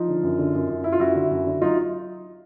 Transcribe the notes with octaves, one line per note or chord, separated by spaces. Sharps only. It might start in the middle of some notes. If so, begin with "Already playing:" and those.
Already playing: F3 D#4 F4
D3
F#2
D3
F#2
F#2
F#2 E4
F4
F#2 E4 F#4
D3
F#2
D3
F#3 D#4 F4